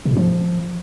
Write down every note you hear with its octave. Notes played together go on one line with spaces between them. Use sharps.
C3
A2
F3